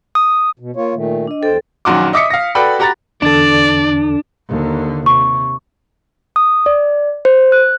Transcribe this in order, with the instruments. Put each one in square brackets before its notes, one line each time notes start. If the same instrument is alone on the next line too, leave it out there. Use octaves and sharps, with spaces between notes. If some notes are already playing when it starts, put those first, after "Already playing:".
[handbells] D#6
[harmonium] B2
A#3 F4 C#5
A#2 D#3 A3
[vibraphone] D4 D#5
[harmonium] E2 C5 G5 [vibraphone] A4
[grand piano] A#1 F#2 D#3 F#4 C6 D6
D#5 E5 D6 D#6 B6 C#7
F5 A#6
F#4 A4 B4 D5 G5 B5
F#4 G4 F#5 A#5 B5 A6
[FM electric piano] E2 D3 A4 [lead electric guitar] D4 [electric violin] D5
[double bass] D#2 D3
[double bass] C3 [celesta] C#6
[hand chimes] D#6
D5
C5
F#6